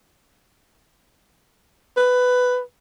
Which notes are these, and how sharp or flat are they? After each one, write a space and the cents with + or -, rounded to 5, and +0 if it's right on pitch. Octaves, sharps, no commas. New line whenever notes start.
B4 +10